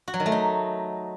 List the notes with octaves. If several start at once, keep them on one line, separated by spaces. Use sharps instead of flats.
F#4
F#3
D#3
A3
D#4